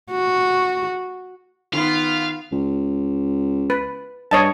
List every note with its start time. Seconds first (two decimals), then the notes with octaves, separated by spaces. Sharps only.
0.11 F#4
1.73 D#3 B3 F4 F5
2.52 C#2
3.70 B4
4.31 G2 C#5 D#5 A5